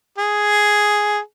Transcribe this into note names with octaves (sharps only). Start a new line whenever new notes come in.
G#4